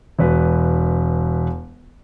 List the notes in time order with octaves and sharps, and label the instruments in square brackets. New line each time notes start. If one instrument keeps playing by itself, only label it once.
[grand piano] E1 B4